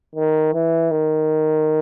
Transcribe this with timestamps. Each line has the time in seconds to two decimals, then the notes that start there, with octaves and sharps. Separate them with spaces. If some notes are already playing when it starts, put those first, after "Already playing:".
0.16 D#3
0.54 E3
0.91 D#3